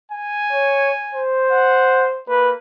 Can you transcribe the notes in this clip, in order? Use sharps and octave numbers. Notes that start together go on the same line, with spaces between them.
G#5
C#5
C5
F#5
A#3 B4